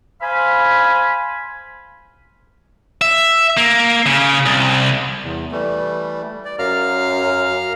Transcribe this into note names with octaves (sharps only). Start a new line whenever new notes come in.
C5 F5 G#5 B5
E5
A#3
C#3
C2
E2
E3 G3 A3
D5
F#2 F5 A#5 F6